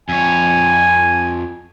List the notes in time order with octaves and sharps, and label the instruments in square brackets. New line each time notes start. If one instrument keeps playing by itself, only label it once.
[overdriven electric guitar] F2 C#5 [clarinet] G#5